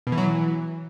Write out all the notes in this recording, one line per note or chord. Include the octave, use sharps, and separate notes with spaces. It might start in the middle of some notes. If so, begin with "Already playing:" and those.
B2
E3
F#3
E3